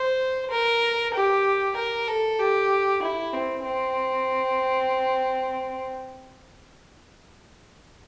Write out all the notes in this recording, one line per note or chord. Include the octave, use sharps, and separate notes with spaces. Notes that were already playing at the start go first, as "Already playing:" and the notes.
Already playing: C5
A#4
G4
A#4
A4
G4
E4
C4
C4